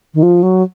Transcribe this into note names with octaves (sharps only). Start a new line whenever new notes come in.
D#3
F3
F#3